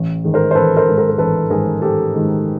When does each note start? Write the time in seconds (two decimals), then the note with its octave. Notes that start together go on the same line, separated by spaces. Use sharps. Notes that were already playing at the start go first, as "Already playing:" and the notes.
Already playing: A1
0.24 G#2 D#3 G#3
0.34 A#4 C5
0.51 C5
0.55 A1 A4 B4
0.76 A#4 C5
0.87 G#2 D#3 G#3
0.98 A#4 C5
1.09 A#4
1.18 A1 A4 B4
1.50 G#2 D#3 G#3 G#4 A#4
1.82 A1 G4 A4
2.14 G#2 D#3 G#3